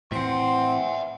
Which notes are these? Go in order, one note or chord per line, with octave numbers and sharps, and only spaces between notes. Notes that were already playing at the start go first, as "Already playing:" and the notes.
A2 E3 C4 E5 F#5 C6